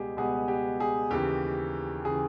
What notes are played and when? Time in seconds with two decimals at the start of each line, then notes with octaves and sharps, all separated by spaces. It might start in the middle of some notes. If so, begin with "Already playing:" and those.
Already playing: C#2 B2 G3 B3 G4 G#4
0.17 C#2 B2 G3 B3 G#4
0.48 G4
0.80 G#4
1.10 D#2 C#3 E3 G4
2.05 C#3 E3 G#4